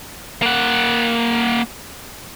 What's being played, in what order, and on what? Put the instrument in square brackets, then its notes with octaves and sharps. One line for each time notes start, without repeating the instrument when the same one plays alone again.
[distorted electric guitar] A#3 F#5